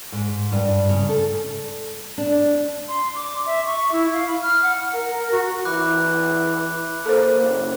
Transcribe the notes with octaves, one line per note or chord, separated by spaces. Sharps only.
G#2
G2
C#3
A4
D4
C6
D6
E5
C#6
E4
F5
B5
F6
F#5
A#4
A#4
F#4
E3 B5 D6 F#6
A#3 A4 C5
F#1